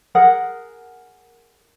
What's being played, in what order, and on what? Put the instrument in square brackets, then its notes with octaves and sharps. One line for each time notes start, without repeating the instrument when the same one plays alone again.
[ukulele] G#4 A#4 F#5